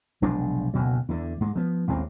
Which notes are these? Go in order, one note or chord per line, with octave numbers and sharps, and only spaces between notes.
F1 B1 G#3 D4
F#1 D2 B2 F#3
E2 D3
G#2 G#3
F3 B3
A1 D#2 G#3 C4